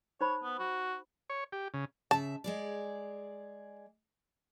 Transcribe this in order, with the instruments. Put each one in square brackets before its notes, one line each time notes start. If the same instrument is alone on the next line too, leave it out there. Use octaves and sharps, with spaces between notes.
[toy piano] D#4 C5 B5 [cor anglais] C#5
[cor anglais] B3
F#4
[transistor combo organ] C#5
G4
C#3
[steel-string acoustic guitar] C#3 E5 [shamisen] A5
[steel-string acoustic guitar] G#3 G#4 D5